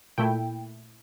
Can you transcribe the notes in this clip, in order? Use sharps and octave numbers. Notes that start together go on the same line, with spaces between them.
A#2 A3 E4 G5